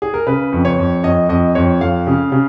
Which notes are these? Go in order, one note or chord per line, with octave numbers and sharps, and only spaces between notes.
G#4
A#4
C#3 B4
F2
C#5
F2
F2 D#5
F2 D#5
F2 C#5
F2 F5
C#3
C#3